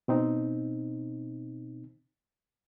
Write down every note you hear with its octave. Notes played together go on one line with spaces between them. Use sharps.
B2 C4 D#4